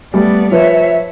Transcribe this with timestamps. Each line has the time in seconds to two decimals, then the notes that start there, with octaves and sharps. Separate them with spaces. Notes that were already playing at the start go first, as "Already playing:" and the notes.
0.14 G3 A3 B3 D5
0.52 F3 B4 C#5 E5